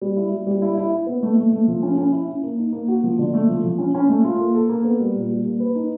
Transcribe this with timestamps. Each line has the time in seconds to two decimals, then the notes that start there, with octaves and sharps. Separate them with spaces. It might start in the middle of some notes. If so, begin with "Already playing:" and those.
0.02 G3
0.16 E4
0.31 G3
0.47 G3
0.62 E4
0.77 E4
0.92 E4
1.06 B3
1.23 A3
1.37 A3
1.52 A3
1.68 F3
1.83 C#4
1.98 C#4
2.12 E4
2.28 C#4
2.43 A#3
2.58 D#4
2.73 A#3
2.88 F#4
3.04 F3
3.19 D3
3.34 A3
3.49 F3
3.64 F3
3.78 C#4
3.95 C#4
4.09 A3
4.24 F4
4.39 A#3
4.54 A4
4.69 A#3
4.85 B3
5.00 G3
5.15 A#2
5.30 G3
5.45 A#3
5.60 B4
5.75 D#4